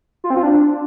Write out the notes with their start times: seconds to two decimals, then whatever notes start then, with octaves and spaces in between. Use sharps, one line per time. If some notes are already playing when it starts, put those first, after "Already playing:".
0.24 F4
0.30 C4
0.37 F4
0.43 D4